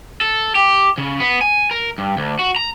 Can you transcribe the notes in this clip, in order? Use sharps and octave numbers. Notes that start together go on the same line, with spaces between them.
A4
G4
C#3
B3
G#5
A#4
G2
D2
F#4
A#5